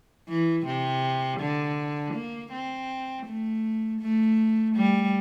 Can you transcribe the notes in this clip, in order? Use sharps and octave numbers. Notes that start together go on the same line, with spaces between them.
E3
C3
D3
A#3
C4
A3
A3
G3